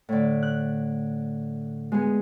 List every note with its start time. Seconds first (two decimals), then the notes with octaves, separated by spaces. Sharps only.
0.09 A2 D3
0.43 F#6
1.92 G#3 B3 G#4